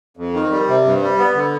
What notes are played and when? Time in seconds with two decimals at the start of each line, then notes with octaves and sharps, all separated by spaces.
0.17 F2
0.34 D#3
0.51 G3
0.68 C3
0.85 G2
1.02 G3
1.18 B3
1.35 D3